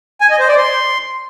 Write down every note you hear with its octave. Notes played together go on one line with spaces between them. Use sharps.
G#5
D#5
C5
D5
C6